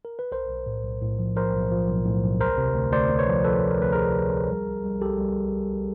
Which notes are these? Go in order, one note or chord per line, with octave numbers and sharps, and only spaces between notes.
A#4
B4
B1 A#4 C5
B1
A2
B1
A2
F3
F3 A#4 C5
B1
F3
B1
A2
B1
D2 A#4 C5
C3
D2
D2 C5 D5
D2
B4 C#5
F3
F3 A4 B4
D2
A#4
D2 B4
D2 G#4 A#4
D2
F3
G3
C2
G3
C2 G4 A4
G3